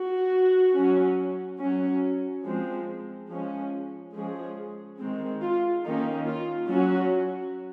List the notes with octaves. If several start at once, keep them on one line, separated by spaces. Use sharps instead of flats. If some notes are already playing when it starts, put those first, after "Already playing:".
Already playing: F#4
F#3 C#4
F#3 C#4
F3 G#3 C4
F3 G#3 C#4
F3 G#3 C#4 G#4
D#3 G#3 C4
F4
D#3 A#3 C#4 D#4
F4
F#3 C#4 F#4